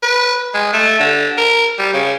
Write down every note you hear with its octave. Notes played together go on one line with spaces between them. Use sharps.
B4
G#3
A3
D3
A#4
G3
C#3